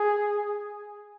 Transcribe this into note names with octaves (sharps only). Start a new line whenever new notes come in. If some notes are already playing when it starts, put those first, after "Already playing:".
Already playing: G#4